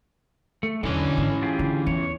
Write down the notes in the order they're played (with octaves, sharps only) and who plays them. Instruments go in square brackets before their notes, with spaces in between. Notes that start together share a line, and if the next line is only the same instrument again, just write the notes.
[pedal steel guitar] A3
[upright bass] B1 E2 [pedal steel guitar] D3 D#5 [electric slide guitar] E3 C#4
[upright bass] G#2
[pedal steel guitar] F4 G4 G#4
[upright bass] D3
[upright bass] E2 [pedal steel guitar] C#5